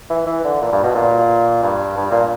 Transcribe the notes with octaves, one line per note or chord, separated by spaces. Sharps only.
E3
E3
D3
A#2
G2
B2
A#2
G2
G2
A#2